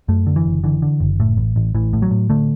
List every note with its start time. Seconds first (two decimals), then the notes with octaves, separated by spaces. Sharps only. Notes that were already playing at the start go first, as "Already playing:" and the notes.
0.08 F#2 A3
0.27 D3
0.36 E3
0.46 F#1
0.64 D3 E3
0.82 D3
1.00 F#1
1.20 A2
1.37 A1
1.56 A1
1.75 A1 E3
1.93 A2
2.02 F#3
2.11 A2
2.30 D3 A3